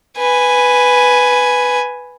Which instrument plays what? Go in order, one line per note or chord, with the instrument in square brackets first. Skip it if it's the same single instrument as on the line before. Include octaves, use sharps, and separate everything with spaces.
[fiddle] B4 G#5